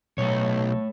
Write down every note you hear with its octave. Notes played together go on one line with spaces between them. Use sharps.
B1 A3 C#5